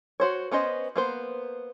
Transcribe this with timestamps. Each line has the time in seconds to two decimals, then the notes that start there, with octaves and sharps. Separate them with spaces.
0.20 F#4 C5 C#5
0.51 B3 C#4 C5 D#5
0.96 A#3 B3 C5